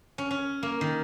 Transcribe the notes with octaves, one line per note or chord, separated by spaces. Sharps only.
C#4
C#4
A#3
D#3